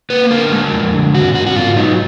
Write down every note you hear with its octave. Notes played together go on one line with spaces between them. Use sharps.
A#3 B4
D3 A#4
G#3
F2
D3
G#2 F#4
G#2 F#4
F#4
G#2 F4
F#3 D#4